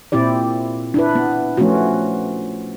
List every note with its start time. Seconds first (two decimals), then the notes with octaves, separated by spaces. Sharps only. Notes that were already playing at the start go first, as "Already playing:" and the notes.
0.12 A#2 C4 E4 G4 D5
0.94 D4 E4 B4
1.15 B3
1.57 F3 A3 B3 C#4 F4 F#4